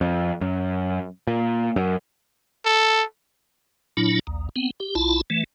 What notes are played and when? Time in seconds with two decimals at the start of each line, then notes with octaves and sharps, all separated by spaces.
0.01 F2
0.41 F#2
1.27 A#2
1.76 F#2
2.65 A4
3.97 A#2 F#3 D4 E4
4.27 A#1 D#2
4.56 B3 C4
4.80 G4
4.95 B1 E4 F4 A5
5.30 E3 A3